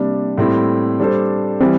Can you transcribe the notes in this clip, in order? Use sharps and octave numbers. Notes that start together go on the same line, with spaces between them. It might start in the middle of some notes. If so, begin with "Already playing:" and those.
Already playing: C3 G3 A#3 D4
A2 G3 C4 E4
G3 D4 A4 C5
E3 G3 C4